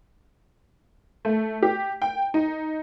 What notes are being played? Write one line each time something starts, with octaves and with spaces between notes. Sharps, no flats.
A3
G4
G5
D#4